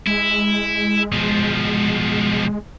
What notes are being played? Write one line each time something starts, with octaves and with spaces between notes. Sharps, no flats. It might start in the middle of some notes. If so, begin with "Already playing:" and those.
G#3 E4
B2 F3